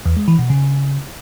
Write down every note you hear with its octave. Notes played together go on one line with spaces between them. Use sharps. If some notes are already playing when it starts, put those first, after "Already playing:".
E2
G#3
E3
B2
C#3